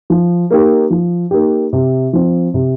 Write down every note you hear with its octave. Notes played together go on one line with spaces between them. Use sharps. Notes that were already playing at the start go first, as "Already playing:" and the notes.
F3
A#3 D#4 G4
F3
A#3 D#4 G4
C3
F3 C4
C3